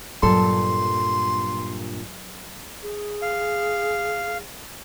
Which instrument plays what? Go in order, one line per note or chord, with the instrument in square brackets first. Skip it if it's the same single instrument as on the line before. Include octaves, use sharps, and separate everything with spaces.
[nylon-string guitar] G2 A#2 A4 [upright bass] F#3 [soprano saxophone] C6
[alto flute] G#4
[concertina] F5